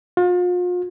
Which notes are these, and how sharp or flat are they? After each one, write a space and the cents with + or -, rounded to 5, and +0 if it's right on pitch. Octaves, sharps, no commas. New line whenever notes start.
F4 +40